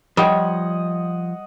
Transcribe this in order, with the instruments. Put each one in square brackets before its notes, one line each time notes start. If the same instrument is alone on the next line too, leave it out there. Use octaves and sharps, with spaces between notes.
[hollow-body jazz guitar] F3 F4 C#5 [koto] G3 [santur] D#5 F#5